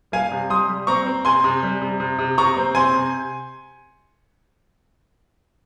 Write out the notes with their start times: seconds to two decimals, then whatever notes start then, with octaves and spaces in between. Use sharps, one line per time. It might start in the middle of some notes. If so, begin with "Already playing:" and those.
0.12 G3 F5 G#5
0.31 C3
0.50 G3 C6 D#6
0.68 G3
0.87 C4 A#5 C#6
1.06 C4
1.25 C3 G#5 C6
1.44 C3
1.63 G3
1.82 C3
2.00 C3
2.19 C3
2.38 C3 A#5 C#6
2.57 C4
2.75 C4 G#5 C6
2.94 C3